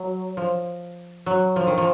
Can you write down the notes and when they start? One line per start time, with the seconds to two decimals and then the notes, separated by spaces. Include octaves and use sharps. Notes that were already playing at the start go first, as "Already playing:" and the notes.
Already playing: F#3
0.37 F3
1.26 F#3
1.56 F3
1.67 D#3
1.78 F3